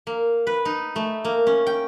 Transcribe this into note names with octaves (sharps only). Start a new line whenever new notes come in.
A#3
B4
D#4
A3
A#3
C#4
G5